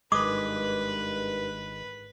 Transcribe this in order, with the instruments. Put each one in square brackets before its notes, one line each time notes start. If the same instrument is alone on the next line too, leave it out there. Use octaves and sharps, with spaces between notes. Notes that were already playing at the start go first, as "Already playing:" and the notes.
[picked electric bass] G#1 G#3 [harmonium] G2 D#3 [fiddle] B4 [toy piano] D6 D#6